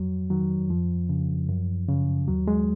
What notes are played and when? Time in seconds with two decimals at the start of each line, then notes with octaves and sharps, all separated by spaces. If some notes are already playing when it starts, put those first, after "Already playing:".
Already playing: F2 F#3
0.30 D#3 F#3
0.70 F2 F3
1.09 C#3
1.49 F#2
1.88 C#3
2.28 D#2 F#3
2.48 G#3